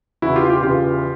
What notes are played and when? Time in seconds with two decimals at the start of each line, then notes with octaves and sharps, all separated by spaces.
0.22 E2 C#3 E3 E4 F#4
0.36 F4 G4
0.50 F4 G4
0.63 E2 C#3 E3 F4 G4